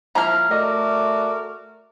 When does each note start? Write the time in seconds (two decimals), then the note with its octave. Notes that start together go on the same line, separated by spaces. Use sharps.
0.15 F3 A#3 E4 A#5 F6
0.51 A3 F#4 A#4 D5 D#5